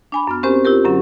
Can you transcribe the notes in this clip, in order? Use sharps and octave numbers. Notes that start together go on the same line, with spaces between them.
D4 G#5 B5
F#2 B3 F6
C4 C#4 G4 A#4 C5 G#5
C4 E4 F4 G4 A#4
F#2 D3 F#3 C#4